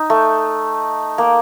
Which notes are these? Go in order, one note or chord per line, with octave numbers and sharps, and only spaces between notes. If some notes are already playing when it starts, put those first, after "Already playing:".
Already playing: D#4
A3
A#3